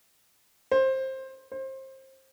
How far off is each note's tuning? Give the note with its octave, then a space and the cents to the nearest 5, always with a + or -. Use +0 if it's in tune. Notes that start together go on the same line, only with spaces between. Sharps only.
C5 +15
C5 +25